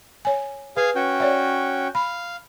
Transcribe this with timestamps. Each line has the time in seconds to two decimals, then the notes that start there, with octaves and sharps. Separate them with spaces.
0.25 C#5 G#5
0.77 G#4 B4 F5
0.95 C#4 F#4 G5
1.20 C#5 D5 E5
1.95 F5 B5